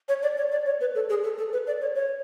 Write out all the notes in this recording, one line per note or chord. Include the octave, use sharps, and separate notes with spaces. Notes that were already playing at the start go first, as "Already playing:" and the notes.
C#5
D5
C#5
D5
C#5
B4
A4
G#4
A4
A4
B4
D5
C#5
C#5